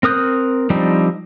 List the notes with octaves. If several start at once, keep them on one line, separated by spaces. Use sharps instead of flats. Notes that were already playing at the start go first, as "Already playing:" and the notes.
C4 A#4 D#6 F#6 G6
F3 G3 C4 D4 D#4